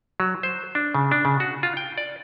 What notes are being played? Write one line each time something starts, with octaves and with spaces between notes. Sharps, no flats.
F#3
C5
D4
C#3
D4
C#3
F#4
F4
G5
D5